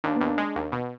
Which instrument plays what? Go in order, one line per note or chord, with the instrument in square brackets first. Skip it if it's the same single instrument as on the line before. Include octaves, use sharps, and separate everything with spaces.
[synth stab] D#2 [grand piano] D4
[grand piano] B3
[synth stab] D#2
[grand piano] D4
[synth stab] G#3
D#2
B2